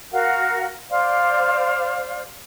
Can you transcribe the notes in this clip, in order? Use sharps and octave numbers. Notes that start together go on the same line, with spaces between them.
F#4 A#4 F5 F#5
C5 D5 F5